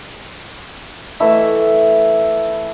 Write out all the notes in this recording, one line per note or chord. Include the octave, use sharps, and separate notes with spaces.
E3 A3 E5 F#5